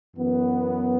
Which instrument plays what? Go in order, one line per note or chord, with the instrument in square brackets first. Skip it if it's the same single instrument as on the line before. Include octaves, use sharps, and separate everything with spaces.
[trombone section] F#2 E3 B3